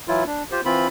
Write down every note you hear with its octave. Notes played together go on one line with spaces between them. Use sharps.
E3 F#3 E4 F4
D4
F4 G4 C5
E3 C4 F4 B5